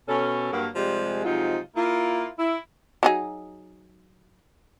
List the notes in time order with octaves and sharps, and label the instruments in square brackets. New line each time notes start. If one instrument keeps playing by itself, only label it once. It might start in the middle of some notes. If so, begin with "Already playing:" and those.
[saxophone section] B2 C#4 A4
G2 F#3 A#3
C3 F3 G3 G#3
C3 F3 F#3 G#3 D#4 F4
A#3 E4 F4
E4
[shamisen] F#3 D#4 G#4